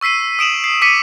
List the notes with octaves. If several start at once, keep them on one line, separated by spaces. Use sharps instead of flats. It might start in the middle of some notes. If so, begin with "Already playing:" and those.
C#6 E6 B6 C7 D#7
D#6 D7 E7 F#7
C7
D6 D#6 B6 C#7 D#7